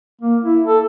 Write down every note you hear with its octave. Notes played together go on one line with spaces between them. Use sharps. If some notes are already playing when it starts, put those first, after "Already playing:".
A#3
E4
A4